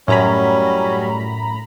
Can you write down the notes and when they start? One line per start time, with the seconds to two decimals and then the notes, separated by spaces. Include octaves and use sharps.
0.08 F#2 A2 F#3 G3 C#4 G#5 A#5 B5